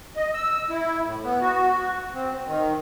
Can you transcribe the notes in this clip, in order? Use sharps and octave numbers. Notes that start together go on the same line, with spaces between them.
D#5
E6
E4
A2
B3
F#4
C4
D#3